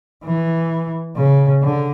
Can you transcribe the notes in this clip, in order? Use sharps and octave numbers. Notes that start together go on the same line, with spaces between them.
E3
C#3
D3